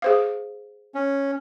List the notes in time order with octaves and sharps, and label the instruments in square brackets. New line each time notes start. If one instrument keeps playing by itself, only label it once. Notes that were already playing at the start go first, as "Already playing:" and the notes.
[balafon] G#4 C5 F5
[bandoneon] C#4